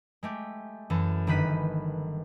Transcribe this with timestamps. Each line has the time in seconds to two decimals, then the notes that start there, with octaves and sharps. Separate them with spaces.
0.23 G#3 A3 G4
0.90 F#2 E3 A4
1.27 G1 D#3 B4 B6 D#7